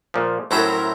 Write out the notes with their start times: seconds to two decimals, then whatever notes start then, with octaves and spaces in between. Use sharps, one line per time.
0.14 A#2 F3
0.51 A2 F#3 C#4 E4 A#4 C5 E5 A#5